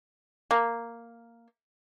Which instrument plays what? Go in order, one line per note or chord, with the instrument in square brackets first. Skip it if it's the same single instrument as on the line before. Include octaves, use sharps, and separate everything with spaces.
[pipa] A#3